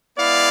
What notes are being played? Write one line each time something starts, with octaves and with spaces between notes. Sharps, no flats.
G#3 B3 E4 D5 F5